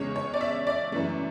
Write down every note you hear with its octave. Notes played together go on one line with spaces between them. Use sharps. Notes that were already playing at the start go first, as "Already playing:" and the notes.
Already playing: E2 C#3 G#3 C#4 C#5
C#5
D5
E5
D5
F#2 E3 A3